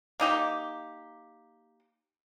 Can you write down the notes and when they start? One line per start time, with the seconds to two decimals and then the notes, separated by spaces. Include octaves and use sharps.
0.20 A#3 D#4 G4